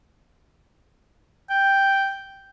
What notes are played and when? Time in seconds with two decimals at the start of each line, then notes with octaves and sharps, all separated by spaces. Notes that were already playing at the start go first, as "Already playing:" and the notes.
1.50 G5